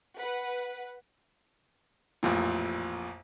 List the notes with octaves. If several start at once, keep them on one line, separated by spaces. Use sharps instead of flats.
B4 F#5
A1 F2 A#2